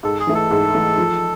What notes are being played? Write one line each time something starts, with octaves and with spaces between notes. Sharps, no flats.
G#2 A4
G#4
E3 A3
A4
G#2
E3 A3
F3